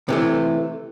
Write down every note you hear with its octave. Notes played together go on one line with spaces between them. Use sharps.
C3 E3 A3